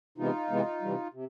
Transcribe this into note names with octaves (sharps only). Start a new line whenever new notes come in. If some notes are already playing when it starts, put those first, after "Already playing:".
C3 E3 G#3 B3 D#4 F4
C3 E3 G#3 B3
C3 E3 G3
C3